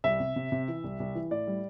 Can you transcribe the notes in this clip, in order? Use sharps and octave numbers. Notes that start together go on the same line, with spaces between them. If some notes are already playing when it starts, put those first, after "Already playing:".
C2 E5
C3
C3
C3
E3
C2
C2
E3
A2 D5
G3